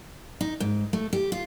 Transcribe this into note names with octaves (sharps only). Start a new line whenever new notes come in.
D#4
G#2
A3
G4
F4